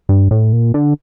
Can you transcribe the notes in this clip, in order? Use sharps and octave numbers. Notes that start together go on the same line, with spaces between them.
G2
A2
A#2
D3